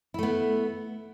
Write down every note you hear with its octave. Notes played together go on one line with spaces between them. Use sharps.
A3 B3 E4